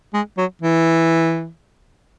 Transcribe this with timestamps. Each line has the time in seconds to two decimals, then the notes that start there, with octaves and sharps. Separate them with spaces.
0.14 G#3
0.38 F#3
0.62 E3